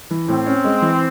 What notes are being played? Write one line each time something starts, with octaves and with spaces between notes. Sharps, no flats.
E3
A2 C4
C#4
G#3
E3